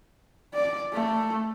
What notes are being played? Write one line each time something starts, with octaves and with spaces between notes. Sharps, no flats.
D5
A3